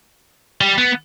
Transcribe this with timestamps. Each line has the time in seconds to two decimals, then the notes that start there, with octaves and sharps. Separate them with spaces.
0.61 G3
0.78 B3